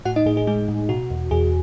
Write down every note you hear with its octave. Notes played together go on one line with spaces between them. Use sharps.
A2 F#4 F#5
D#4 D#5
A2 G#4
G#4
G#3 G#4
A2
B2 F#4
E2
E2 G#4